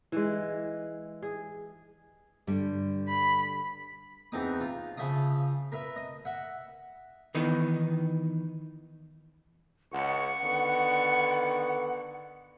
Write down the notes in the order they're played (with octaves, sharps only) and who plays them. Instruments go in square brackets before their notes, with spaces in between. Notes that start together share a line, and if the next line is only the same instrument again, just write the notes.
[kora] E3 G#3
G#4
[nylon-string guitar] G2 D3 G3
[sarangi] B5
[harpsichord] E2 E3 C4 D#4 D6 D#6
F4
C#3 F3 E5 D#6
A#4 B4 E5
D#5
E5 F#5
[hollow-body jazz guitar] D#3 E3 B3 D#4
[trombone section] C#2 [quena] F#5 [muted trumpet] C#6
[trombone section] D3 D#3 B3